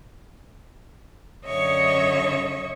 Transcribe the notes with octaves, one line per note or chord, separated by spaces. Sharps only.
F#2 D3 C#5 D#5 E5 C#6